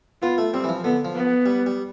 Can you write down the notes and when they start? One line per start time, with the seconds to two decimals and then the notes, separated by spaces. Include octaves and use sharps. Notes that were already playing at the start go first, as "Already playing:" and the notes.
0.22 B3 F4
0.38 A3
0.53 G3 C4
0.64 E3
0.69 F3
0.84 D3 B3
1.05 F3
1.14 B3
1.46 G3
1.66 G3